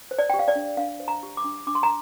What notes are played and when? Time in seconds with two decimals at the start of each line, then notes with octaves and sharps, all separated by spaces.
0.11 C5
0.19 D5
0.30 G5
0.34 G4
0.39 F5
0.48 D5
0.55 D4
0.77 D4 F5
1.00 C5
1.08 A#5
1.23 G4
1.37 D6
1.44 D4
1.67 D4 D6
1.75 C6
1.83 A#5